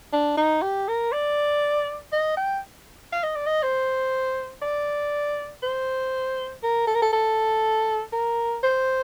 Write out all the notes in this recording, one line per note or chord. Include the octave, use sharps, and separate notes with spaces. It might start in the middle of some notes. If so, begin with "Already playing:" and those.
D4
D#4
G4
A#4
D5
D#5
G5
F5
D#5
D5
D#5
C5
D5
C5
A#4
A4
A#4
A4
A4
A#4
C5